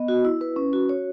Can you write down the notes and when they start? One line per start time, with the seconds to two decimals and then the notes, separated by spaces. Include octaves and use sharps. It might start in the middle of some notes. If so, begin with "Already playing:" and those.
Already playing: B3 D#5
0.08 F#4
0.25 E4
0.41 B4
0.56 C#4
0.73 F#4
0.89 C#5